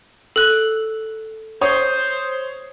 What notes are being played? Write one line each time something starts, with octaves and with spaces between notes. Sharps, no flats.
A4 F#6
C5 C#5 D#6